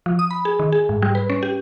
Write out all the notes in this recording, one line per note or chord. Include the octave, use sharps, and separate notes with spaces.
F3
D#6
B5
G#4
D#3
G#4
G#2
G3
B4
C#4
G4